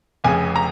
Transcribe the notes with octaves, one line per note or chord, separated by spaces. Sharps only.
F1 F2 C#3 G#5
A#5